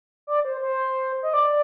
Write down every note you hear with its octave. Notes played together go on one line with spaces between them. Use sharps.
D5
C5
C5
D#5
D5